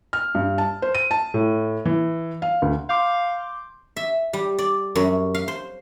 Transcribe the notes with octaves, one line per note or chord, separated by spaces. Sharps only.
F6
G2
A5
C5
D#7
A5
A2
E3
F5
D2
F5 C6 D6 G6
E5
G3
D5
F#2
F5
C5